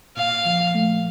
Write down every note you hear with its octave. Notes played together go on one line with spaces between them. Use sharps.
A#2 F5
F3
A3